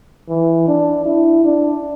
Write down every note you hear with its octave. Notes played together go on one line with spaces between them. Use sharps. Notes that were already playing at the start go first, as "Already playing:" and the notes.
E3
D4
E4
D4